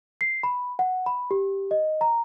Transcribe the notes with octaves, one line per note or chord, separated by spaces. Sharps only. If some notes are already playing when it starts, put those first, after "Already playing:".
C7
B5
F#5
B5
G4
D#5
A#5